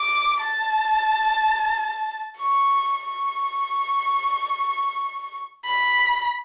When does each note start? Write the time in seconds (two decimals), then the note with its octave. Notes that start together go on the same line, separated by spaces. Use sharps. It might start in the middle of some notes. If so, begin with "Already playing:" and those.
Already playing: D6
0.42 A5
2.38 C#6
3.04 C#6
5.66 B5